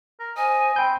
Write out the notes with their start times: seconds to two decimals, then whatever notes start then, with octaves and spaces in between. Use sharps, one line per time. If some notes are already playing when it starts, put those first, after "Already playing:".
0.20 A#4
0.37 C5 D#5 G#5
0.76 C4 G5 B5 G6